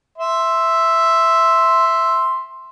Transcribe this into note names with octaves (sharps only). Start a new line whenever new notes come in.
E5 C6